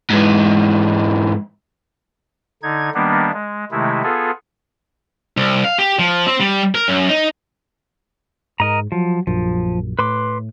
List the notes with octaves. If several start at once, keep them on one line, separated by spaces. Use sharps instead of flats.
G#2 E3
D3 D#4 G#6
D#3 G3 A#3 B3 D4
G#3
C3 D#3 G#3 A3 E4
B3 F4 G#4 A4
C2
F5
G4
F3
C4
G3
A#4
F#2
D#4
G#2 A#4 D#5 A#5
F3 F#3
A#1 F#2 F3
A2 B4 C6 D6